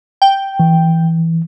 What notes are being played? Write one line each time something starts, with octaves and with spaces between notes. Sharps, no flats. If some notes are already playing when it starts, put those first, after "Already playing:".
G5
E3